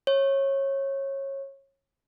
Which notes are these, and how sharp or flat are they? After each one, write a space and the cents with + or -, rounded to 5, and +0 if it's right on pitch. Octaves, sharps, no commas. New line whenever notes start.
C#5 -20